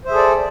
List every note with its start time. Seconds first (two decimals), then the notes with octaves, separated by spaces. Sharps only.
0.05 C5
0.08 E5
0.11 G#4
0.14 A4
0.17 D5